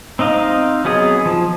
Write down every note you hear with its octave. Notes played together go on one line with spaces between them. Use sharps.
C4 D#4 D#5 F5
F#3 B3 G#4 D#5
F3